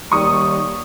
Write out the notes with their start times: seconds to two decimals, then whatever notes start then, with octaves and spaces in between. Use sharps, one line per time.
0.12 D#2 G3 C#6 D#6